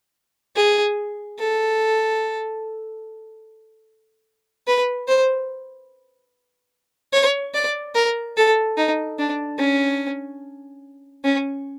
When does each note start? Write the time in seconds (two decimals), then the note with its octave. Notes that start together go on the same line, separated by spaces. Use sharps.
0.56 G#4
1.39 A4
4.68 B4
5.08 C5
7.14 C#5
7.55 D5
7.95 A#4
8.37 A4
8.78 D#4
9.19 D4
9.59 C#4
11.24 C#4